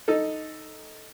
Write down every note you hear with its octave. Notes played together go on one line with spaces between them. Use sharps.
D#4 A4